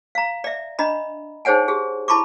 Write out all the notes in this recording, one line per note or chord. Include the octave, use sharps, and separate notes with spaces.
F5 A#5
D5 E5
D4 D#5 A#5 B5
D#4 G#4 C5 C#5 F#5 G#5
G4 G#4
E4 A5 B5 C#6 D6